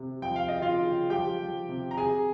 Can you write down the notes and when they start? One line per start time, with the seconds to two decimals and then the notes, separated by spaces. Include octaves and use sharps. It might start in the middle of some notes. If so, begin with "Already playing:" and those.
Already playing: C3
0.22 F3 G5
0.36 F5
0.48 C#3 D#5
0.62 F4 F5
0.81 C#3
1.10 F3 G4 G5
1.39 F3
1.69 C3
1.91 A#5
1.97 C3 G#4 G#5